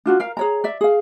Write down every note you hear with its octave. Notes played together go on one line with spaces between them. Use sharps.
D4 F4 F#4
A#4 F5
G#4 C#5 A#5
D5 E5
G#4 F5